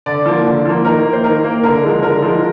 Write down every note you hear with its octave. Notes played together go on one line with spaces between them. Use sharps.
D3 D5
F3 A#3
D3
F3 A#3
D#3 A#4
A#3
C5
D#3 A#4
A#3
D3 A#4
F3 G#3
D3 A#4
F3 G#3